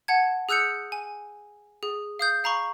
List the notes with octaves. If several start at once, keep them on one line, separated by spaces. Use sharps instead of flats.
F#5 A5 G#6
G#4 E6 F#6 G6 C#7
G#5
G#4
F5 D#6 G6
F5 A#5 B5 C#6